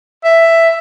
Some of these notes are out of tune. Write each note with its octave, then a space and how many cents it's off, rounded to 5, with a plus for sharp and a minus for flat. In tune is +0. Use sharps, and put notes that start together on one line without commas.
E5 +5